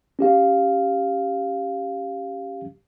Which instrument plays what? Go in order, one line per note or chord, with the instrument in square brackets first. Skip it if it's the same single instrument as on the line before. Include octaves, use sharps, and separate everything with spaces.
[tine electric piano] C#4 G4 F5